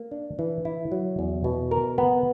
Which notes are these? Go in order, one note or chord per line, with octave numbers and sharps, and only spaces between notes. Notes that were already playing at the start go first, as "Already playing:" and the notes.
Already playing: A#3
D4
E3
E4
F#3
E2
B2
A#4
B3